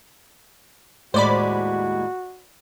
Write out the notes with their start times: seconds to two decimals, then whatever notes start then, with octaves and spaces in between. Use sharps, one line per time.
1.14 D#2 A2 G#3 F#4 C5 D5 B5